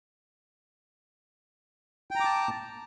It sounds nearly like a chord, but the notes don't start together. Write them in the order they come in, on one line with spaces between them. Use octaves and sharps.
G5 A#5 D6 A5